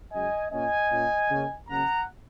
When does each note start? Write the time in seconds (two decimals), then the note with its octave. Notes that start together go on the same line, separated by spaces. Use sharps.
0.12 F#2 C#3 G#3 D#5 G#5
0.52 A#2 A#3 C#4 D#5 G#5
0.90 A#2 A#3 C#4
1.29 C#3 A#3 C#4
1.69 C#3 F#3 A#3 C#4 F#5 A#5